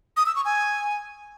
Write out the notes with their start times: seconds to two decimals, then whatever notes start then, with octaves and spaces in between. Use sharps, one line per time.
0.17 D#6
0.26 E6
0.36 C#6
0.45 G#5